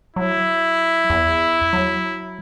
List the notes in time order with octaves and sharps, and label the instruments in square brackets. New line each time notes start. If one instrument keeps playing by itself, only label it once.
[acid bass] F#3 [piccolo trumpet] E4
[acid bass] E2
F#3